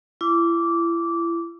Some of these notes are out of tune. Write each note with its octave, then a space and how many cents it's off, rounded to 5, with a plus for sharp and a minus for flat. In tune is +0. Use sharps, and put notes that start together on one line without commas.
E4 +35 D6 -15